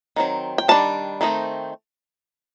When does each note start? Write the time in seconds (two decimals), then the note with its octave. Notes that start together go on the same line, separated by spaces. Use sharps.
0.16 D#3 F#3 C4
0.58 G5
0.68 D#3 G3 D4 A5
1.21 D#3 A3 C4 D#4